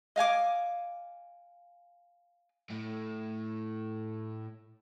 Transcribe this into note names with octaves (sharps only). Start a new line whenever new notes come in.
D#5 F5 G#5 D6
A2 A3